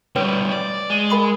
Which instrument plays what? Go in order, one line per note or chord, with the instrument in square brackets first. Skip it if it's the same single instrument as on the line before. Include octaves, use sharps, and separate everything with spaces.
[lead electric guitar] D2 G3 [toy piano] C#4 B4 C#5
[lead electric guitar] D5
G#3
[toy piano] A#4 B5 D#6